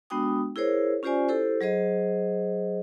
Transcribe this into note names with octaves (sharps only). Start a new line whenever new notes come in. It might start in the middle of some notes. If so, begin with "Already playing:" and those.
G#3 B3 D4 F#4 G5 D#6
E4 G#4 A#4 C5 C#5
C#4 F4 G4 C5 D5 G#5
E4 G4 A4 C5
F#3 G#4 C5 D#5